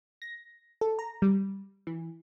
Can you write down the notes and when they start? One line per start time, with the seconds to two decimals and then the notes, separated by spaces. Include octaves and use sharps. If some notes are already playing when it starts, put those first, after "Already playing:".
0.22 A#6
0.81 A4
0.99 A#5
1.22 G3
1.87 E3